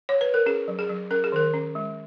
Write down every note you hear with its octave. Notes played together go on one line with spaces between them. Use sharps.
C#5
B4
A#4
C#4 G#4
F#3
G#4
F#3
C#4 A#4
G#4
D#3 A#4
C#4
G#3